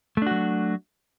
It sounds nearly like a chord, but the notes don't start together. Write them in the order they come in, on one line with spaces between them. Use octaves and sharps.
A3 D4 F#4 F#3